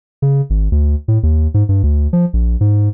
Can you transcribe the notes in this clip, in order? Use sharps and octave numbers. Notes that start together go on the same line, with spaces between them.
C#3
G#1
D2
A2
D#2
G#2
G2
D2
F3
A#1
G#2